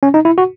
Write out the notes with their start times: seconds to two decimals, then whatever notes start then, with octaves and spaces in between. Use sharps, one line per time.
0.03 C#4
0.14 D#4
0.25 E4
0.38 F#4